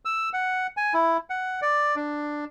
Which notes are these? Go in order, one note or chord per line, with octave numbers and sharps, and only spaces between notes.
E6
F#5
G#5
E4
F#5
D5
D4